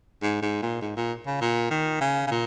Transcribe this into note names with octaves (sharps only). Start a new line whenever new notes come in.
G#2
G#2
A#2
G#2
A#2
C#3
A#2
D#3
C#3
C#3
A#2